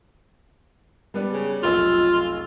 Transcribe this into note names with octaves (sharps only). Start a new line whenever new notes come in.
G3 B3 D4
C#3
F1 B1 F4 E6